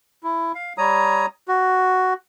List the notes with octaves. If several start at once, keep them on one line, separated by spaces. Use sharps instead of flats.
E4
F5
G3 C#5 A#5 D#6
F#4